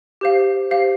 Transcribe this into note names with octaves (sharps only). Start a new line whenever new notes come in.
G4 C5 F5
G4 C5 F5